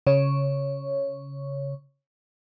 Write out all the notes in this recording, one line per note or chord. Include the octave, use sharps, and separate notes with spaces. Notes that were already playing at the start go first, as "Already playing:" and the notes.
C#3 C#5